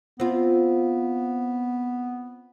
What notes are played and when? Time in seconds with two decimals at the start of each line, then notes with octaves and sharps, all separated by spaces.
0.20 B3 C4 F4